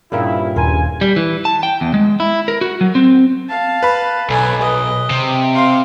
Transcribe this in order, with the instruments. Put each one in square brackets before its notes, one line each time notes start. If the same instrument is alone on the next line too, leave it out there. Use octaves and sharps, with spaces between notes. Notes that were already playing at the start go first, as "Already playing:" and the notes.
[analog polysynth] G2 A#2 C#3 [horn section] E4 [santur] A#4 F5 G5
[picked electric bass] D#1 [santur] A#4 C5 C6 [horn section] G#5
[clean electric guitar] G3
E3
A5
G5
E2
G#3
E4
A#4
F#4
F#3
C4
[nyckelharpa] F5 A5
[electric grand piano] B4 B5
[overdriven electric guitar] B1 [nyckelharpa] A4 G#5
[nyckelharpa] D#5
[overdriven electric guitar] C3
[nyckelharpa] F5 C6